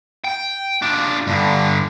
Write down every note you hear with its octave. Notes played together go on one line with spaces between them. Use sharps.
G5
D4 F4
G2 D3